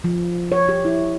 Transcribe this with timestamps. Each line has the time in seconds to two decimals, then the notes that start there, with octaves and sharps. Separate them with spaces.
0.04 F3
0.52 C#5
0.69 G4
0.85 E4